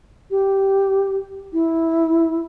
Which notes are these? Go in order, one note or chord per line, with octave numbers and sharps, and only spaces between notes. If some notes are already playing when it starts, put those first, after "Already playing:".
G4
E4